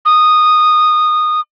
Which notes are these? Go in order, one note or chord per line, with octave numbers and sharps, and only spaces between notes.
D#6